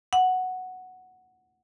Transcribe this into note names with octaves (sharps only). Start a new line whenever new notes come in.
F#5